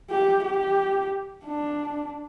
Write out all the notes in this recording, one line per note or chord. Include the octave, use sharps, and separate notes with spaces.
G4
G4
D4